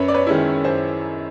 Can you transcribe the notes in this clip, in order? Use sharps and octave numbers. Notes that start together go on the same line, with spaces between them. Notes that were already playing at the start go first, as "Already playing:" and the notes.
Already playing: F#2 B4 C#5
D5
B4 C#5
D#3 G#3 C#4 E4
F#2 C5